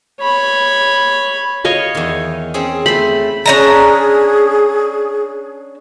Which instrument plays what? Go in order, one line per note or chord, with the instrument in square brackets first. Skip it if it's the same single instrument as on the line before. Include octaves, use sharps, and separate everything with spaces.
[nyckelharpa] C#5 B5
[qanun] C#5 D#5 F5
[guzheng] E2 D#3
C4 C#4 G#4
[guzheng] A3 C5 [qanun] B5
[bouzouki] C#4 D4 A#5 [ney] G#4